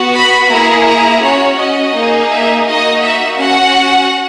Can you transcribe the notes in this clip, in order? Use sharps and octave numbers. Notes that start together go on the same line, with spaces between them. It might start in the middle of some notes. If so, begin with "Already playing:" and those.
Already playing: B3 F#4
B5
A#3 E4 G#4 A#5
A#5
C#4 F#4 C#5
D#5
A#3 D#4 G#4
E5
A#3 D#4 F#4 D#5
E5
C#4 F#4 F#5